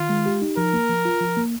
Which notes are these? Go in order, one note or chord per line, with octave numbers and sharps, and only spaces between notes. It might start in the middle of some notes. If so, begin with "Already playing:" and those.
Already playing: D#3 F4
G#3
G4
D#4
F3 A#4
A#3
F3
F4
F3
A#3